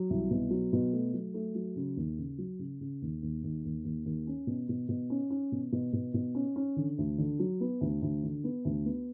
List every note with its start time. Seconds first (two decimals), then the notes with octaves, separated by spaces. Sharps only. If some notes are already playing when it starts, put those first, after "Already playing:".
Already playing: F#3
0.10 C2
0.31 B2
0.51 F#3
0.73 B2
0.93 A3
1.13 F#3
1.34 A3
1.55 F#3
1.76 C#3
1.97 D#2
2.19 C#3
2.38 F#3
2.59 C#3
2.81 C#3
3.02 D#2
3.22 D#2
3.44 D#2
3.65 D#2
3.84 D#2
4.06 D#2
4.27 C#4
4.47 B2
4.69 B2
4.89 B2
5.10 C#4
5.30 C#4
5.52 B2
5.72 B2
5.93 B2
6.14 B2
6.35 C#4
6.56 C#4
6.76 D3
6.98 D2
7.18 D3
7.39 F#3
7.61 B3
7.81 D2
8.02 D2
8.23 D3
8.44 B3
8.65 D2
8.85 B3